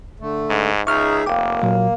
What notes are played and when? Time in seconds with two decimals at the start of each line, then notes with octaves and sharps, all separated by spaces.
0.20 D3 A3
0.49 G#2
0.87 C#2 D#4 G#4 E5 C#6 F6
1.26 F1 A#3 G5 D6
1.63 A#2 F#3